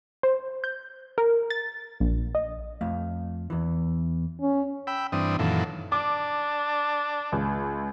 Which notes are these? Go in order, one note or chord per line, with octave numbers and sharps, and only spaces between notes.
C5
G6
A#4
A6
A#1
D#5
F2 A3 F5
E2 E3
C#4
G5 B5 E6
G2 E3 C4 D4 D#6
F#2 A#2 D#3 E3 A4
D4 D6
C#2